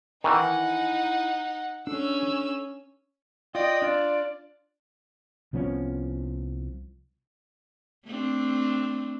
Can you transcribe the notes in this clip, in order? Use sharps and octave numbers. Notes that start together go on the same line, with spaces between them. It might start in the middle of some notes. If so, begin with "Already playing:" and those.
D#3 E3 D#4 E4 F#5 G#5
C#4 D4 A4 E6
F4 D5 D#5 G5 D#6
D4 F4
C2 F3 B3 C#4
A3 C4 D4